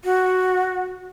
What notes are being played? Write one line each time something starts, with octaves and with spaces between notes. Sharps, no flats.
F#4